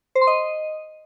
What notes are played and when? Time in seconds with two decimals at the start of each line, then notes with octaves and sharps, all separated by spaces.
0.15 C5
0.21 C6
0.27 D#5